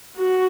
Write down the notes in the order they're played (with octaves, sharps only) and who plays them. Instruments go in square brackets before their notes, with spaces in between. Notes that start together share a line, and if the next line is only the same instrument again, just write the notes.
[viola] F#4